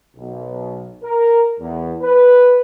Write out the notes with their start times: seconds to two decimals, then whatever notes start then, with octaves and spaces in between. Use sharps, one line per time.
0.16 B1
1.04 A#4
1.59 E2
2.02 B4